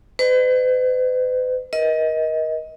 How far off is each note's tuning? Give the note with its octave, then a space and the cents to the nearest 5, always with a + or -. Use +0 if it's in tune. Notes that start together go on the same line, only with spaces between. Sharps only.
B4 +45 D#5 -40
A#4 +35 D#5 +20